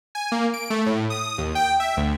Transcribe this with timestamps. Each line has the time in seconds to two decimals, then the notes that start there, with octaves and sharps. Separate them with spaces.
0.15 G#5
0.32 A#3
0.54 D7
0.70 A3
0.86 A2
1.10 D#6
1.38 D#2
1.55 G5
1.80 E5
1.97 D2